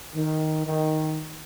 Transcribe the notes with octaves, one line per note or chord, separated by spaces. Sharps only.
D#3
D#3